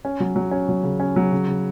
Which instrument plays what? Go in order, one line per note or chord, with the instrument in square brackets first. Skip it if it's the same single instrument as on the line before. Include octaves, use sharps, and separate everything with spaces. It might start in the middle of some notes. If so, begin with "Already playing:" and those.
[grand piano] C#4
F#3
F#3
C#4
F#3
C#3
C#4
F#3
C#3
C#3